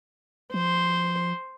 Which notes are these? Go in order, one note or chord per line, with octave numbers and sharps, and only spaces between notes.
F3 C5